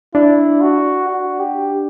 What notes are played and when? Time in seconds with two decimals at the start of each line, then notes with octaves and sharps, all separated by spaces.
0.15 D4 E4
0.61 F#4
1.08 F#4
1.39 G4